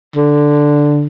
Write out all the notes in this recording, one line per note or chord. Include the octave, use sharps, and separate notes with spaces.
D3